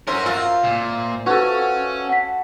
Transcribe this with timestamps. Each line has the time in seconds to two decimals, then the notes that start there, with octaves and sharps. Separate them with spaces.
0.07 C#4 F#4 A#4 C5 E5
0.26 F4 E6
0.64 A#2
1.26 C#4 F#4 A4 B4 C#6
2.09 F#5 B6